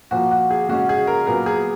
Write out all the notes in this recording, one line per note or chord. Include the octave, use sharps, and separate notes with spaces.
A#2 F3 A#3 F#4
F#4
G#4
C#3 G#3 C#4 F#4
G#4
A#4
A#2 F#3 B3 A#4
G#4